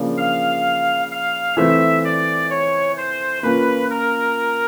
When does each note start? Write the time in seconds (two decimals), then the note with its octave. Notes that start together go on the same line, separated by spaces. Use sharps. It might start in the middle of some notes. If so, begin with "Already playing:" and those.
Already playing: C#3 F3 A#3 D4
0.17 F5
1.11 F5
1.57 E3 A3 C4 E5
2.04 D5
2.50 C#5
2.97 C5
3.43 A#3 C#4 F4 B4
3.90 A#4